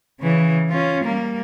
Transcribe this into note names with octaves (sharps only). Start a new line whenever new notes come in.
C#3 E3
C#4 F4
G3 A#3